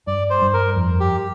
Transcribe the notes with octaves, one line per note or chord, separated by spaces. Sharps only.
G2 D5
C5
G2
A#4
F2
G4